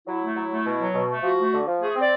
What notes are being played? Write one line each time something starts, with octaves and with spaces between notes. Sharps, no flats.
F#3 E4
A3
F#3
A3
B2
F#3
B2
A3
F3 F#4
A3
D3
F3
A3 G#4
C4
D5